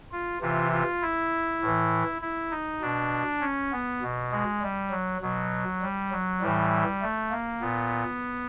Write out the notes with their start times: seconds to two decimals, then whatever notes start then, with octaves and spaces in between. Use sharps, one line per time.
0.12 F4
0.41 C3 E3 F4
0.72 F4
1.02 E4
1.61 A2
1.66 E3
2.21 E4
2.51 D#4
2.81 B2 D4
3.41 C#4
3.72 B3
4.02 B2
4.32 G#3
4.62 G3
4.91 F#3
5.22 B2 F#3
5.82 G3
6.12 F#3
6.41 A2 E3 G3
7.02 A3
7.31 A#3
7.61 A#2 B3